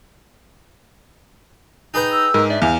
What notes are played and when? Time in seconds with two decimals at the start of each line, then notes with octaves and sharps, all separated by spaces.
1.94 D#4 G#4 B4 G5
2.12 E6
2.34 G#2 A#4
2.50 D4 E5
2.62 E2 F5